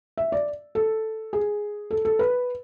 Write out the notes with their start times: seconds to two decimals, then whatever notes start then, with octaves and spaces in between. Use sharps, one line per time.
0.17 E5
0.32 D5
0.75 A4
1.33 G#4
1.91 A4
2.05 A4
2.19 B4